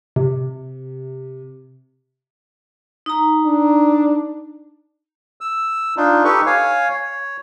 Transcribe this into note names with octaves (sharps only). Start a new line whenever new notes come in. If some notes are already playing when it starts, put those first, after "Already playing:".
C3
D#4 A#5
D4
E6
D4 D#4 F4
D#4 G4 A4 B4 C#6
C#5 F5 G#5
C#5